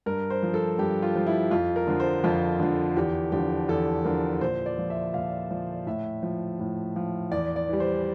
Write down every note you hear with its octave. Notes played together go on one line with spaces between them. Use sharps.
G2 A#4
C5
F3
A4
G2 G4
F4
F3
E4
F2 F4
A#4
D3 F3
C5
F2 F4
D3 F3
E2 G4
D3 F3 G4
E2 A4
D3 F3 A#4
A#2 C5
D5
F3
E5
A#2 F5
F3
A2 E5
F3
A2
F3
E2 D5
D5
E3 G3
C5